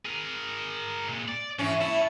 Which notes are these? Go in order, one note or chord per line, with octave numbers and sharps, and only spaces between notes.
G#4 A#4
A#2 G#3
D5
G#2 E3 C#4
E4 C#5 A5